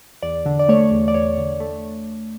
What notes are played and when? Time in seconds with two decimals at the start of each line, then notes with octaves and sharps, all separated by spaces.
0.23 E2 D5
0.46 D3
0.59 D5
0.69 A3 C#5
0.91 E2
1.08 D5
1.14 E2 C#5
1.37 D3
1.60 A3